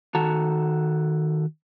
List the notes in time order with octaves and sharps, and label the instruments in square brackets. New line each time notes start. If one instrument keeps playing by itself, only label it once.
[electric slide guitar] D#3 F#4 A4 F#5 A5 A#5